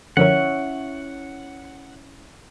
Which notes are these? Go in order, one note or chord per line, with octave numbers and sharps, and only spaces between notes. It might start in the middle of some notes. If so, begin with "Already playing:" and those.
D3 F3 C#4 E4 A#4 C#5 F#5